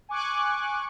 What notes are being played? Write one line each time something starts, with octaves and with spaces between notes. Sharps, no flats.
G#5 C#6 D6 F#6